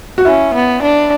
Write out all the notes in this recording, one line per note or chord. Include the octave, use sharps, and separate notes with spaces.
F#4
C#4 E4
B3
D4